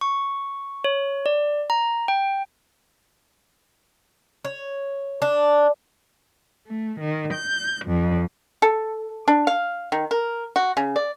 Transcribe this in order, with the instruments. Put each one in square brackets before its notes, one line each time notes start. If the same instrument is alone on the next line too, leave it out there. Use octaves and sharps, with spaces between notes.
[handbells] C#6
C#5
D5
A#5
G5
[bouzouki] C#5
D4
[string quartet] A3
D#3
G6
F2
[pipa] A4
D4
F5
D#3
A#4
F#4
C#3
D5